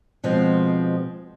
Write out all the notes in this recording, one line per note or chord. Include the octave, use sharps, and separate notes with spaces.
B2 F3 G#3 C4